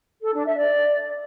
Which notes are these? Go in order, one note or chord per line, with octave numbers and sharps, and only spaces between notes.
A4
D4
E5
D5